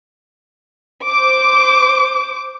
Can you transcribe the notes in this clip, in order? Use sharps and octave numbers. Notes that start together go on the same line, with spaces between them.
C5 D6